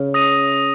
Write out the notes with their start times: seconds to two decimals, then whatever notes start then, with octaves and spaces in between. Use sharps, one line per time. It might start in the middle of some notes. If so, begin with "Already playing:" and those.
Already playing: C#3
0.14 D#6 A#6 D#7